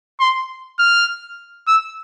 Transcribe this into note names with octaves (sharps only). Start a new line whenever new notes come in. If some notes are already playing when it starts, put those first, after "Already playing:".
C6
F6
E6